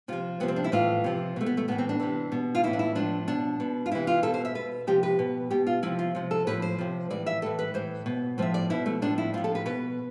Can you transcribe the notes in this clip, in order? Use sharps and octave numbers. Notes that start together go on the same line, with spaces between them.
C3 F3 F4
C3 F3 B3
C4
D4
E4
A2 E3 F4
C3 F3
B2 A3
B3
A3
A2 E3 B3
C4
D4
C3 E3
B2
F4
A2 E3 E4
D4
E4
A2 F3 D4
B2 D4
B2
F4
C3 E3 E4
F4
B2 A4
C5
E5
B2 B4
C3 F3 G4
B4
B2
B2 G4
F4
C3 F3 E4
F4
C3 F3
A4
A2 F3 B4
C5
C3 F3
A2 E3 D5
E5
A2 E3 A4
B4
A2 E3 C5
B2
A2 F3 E5
D5
B2 E4
A3
A2 F3 D4
E4
A2 F3 F4
A4
B4
B2 B4